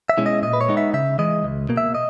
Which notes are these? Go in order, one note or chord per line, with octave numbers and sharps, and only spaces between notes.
E5
B2 G#3 C#4 E4
D#5
A#2 D#5
B4
C#5
G#3 B3 D#4
E5
C#3 E5
E3 G#3 D#5
C#2
B2 A#3
E5
D#5